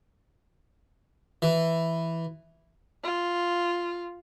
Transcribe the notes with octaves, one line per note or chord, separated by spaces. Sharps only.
E3
F4